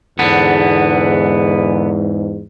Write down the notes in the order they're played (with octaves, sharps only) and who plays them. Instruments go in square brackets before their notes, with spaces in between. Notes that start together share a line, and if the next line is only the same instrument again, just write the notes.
[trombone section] E2 G#2 [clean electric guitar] D3 B3